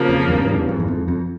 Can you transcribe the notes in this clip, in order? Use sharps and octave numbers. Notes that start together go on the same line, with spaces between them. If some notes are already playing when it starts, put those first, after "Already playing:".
Already playing: C#3 F3 A#3
F2
E2 G2
G#2
E2 G2
F2 G#2
E2
F2
F2